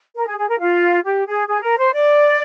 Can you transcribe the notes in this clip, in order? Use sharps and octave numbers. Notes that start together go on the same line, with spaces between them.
A#4
G#4
G#4
A#4
F4
G4
G#4
G#4
A#4
C5
D5